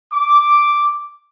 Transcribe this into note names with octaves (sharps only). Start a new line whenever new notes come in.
D6